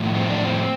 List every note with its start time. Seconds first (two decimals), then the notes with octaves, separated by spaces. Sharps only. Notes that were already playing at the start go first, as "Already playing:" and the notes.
Already playing: A2 F3
0.15 C4
0.29 D4
0.44 C4